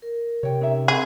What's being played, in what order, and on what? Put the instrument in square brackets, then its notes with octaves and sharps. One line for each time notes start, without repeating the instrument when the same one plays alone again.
[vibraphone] A#4
[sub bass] C3 [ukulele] C#5 G5
[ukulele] C#4 D#4 E5
[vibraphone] C4 E5 [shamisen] G#4 [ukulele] A#4 B5